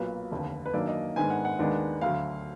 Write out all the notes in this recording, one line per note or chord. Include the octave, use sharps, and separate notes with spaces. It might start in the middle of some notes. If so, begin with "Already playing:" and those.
Already playing: B1 A#2 F#3 A#3 B4
F1 D#2 D3
B4
F#2 D#3 A#3 D4 D5
D#5
G#2 D#3 G#3 B3 D4 G#5
F#5
F#5
D#2 D#3 G#3 B3 D4
D2 D3 F#3 F5